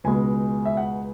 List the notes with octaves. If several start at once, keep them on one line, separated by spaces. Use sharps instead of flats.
C#2 B2 G#3 B3 G#5
E5
F#5